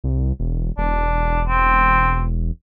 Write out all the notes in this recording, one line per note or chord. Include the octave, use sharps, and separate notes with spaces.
C2
E1
E1 D4
C4